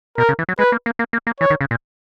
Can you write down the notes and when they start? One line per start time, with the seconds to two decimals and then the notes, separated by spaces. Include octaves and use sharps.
0.18 B2 A#4
0.29 C#3
0.39 E3
0.49 F#3
0.59 G#3 B4
0.72 A#3
0.86 A#3
0.99 A#3
1.13 A#3
1.27 A#3
1.41 E3 C#5
1.50 D#3
1.61 C#3
1.71 A#2